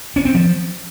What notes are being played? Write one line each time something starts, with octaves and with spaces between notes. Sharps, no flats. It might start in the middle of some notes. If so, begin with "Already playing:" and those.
C#4
C4
F3